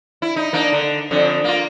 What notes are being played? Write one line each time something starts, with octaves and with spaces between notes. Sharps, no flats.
E4
D#4
A#3 D4 D#4
D3
F2 D3
A#3 F4